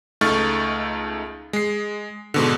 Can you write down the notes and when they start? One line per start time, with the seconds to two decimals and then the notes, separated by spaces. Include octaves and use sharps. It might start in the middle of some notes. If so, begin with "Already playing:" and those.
0.21 C#2 A3 D#4 C#6 F6 A6
1.53 G#3 C7
2.34 G#2 B2 D3